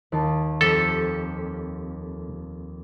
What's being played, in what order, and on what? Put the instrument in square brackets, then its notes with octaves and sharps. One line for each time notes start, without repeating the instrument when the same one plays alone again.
[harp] D#2 D#4 A5
[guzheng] F2 G4 [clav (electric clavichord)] A4